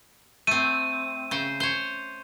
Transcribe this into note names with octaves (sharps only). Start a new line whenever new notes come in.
A3 C4 D#7
C#3 C5
C5 C#5